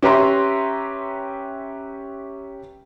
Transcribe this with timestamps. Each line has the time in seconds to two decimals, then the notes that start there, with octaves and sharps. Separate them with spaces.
0.02 C#4 G4 B4 E5 A#5 C6